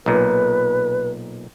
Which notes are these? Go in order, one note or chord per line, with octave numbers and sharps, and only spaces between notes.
B1 A#2 B4